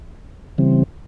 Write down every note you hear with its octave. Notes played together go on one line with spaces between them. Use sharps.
C#3 E3 G3 C4